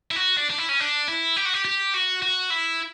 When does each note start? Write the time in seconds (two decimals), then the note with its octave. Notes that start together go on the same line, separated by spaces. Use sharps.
0.11 E4
0.16 F#4
0.37 D4
0.50 D4
0.58 E4
0.69 C#4
0.80 D4
1.08 E4
1.37 G4
1.45 F#4
1.54 G4
1.65 G4
1.94 F#4
2.22 F#4
2.51 E4